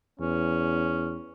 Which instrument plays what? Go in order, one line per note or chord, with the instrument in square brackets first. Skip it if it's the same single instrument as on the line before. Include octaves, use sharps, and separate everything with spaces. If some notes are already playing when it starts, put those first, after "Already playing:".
[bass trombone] E2 [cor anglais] C#4